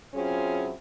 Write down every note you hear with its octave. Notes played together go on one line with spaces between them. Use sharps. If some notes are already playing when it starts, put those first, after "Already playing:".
F#3 C4 C#4 E4 F4 G#4